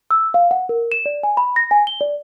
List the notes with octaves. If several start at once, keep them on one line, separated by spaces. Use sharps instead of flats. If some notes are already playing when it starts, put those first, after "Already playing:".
E6
F5
F#5
A#4
E7
D5
G#5
B5
A#6
G#5
G7
D5